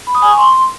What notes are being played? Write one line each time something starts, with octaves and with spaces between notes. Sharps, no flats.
B5
D#6
G#5
C#6
C6